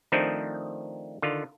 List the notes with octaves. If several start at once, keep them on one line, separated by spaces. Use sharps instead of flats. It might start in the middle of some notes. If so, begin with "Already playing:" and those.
D#3 F3 A3 C4 D4 D#4
D3 D#3 F4